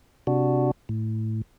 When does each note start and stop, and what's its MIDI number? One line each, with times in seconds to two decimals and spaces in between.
0.27 0.71 48
0.27 0.71 62
0.27 0.71 66
0.89 1.42 45